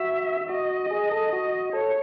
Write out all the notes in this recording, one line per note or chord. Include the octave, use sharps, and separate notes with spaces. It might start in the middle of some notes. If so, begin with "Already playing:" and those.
Already playing: F#4 E5
F#4 D#5
G#4
A4
F#4
A4 C#5